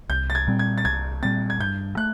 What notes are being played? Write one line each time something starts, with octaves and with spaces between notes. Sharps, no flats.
C2 G6
A6
G#6
A#2 G3 C4
G#6
A6
C2 G#6
A#2 G3 C4 A6
G#6
G2 G6
A3 F#6